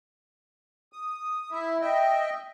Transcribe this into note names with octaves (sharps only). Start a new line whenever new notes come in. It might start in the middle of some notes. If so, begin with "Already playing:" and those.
D#6
E4 E5
D#5 E5 G5